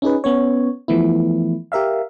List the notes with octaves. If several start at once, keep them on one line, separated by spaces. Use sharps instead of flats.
C#4 D#4 G#4 B4
B3 C#4 C#5
E3 F3 A3 B3 E4
G4 A#4 E5 F5